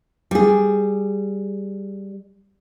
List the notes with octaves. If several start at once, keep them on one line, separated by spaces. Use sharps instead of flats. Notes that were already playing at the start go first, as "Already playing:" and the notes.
G3 G#4